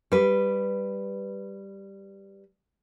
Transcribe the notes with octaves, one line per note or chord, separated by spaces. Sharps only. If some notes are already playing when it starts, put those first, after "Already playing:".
G3 B4